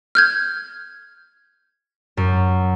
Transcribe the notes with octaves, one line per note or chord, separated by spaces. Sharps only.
F6 G6 G#6
F#2